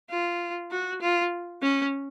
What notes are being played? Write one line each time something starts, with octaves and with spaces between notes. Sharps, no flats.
F4
F#4
F4
C#4